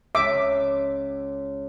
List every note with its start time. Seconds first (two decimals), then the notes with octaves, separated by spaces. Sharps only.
0.15 C#2 E5 D6